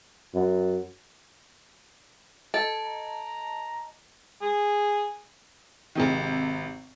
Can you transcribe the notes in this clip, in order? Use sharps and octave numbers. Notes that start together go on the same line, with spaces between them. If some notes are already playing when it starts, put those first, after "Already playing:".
F#2
A4 D#5 A5
A#5
G#4
G#1 C3 D#3